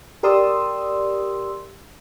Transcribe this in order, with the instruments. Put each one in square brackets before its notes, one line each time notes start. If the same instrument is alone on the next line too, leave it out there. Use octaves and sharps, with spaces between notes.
[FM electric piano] G4 A#4 D5 C6 D#6 E6